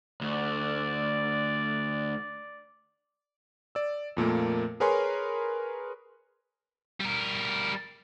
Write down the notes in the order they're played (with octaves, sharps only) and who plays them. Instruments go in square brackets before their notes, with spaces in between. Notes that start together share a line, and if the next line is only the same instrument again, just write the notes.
[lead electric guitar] D2 [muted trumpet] D5
[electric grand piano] D5 E6
F2 A#2 A3 A#3
G#4 A#4 B4 C#5 G#5 C6
[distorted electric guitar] G3 A#4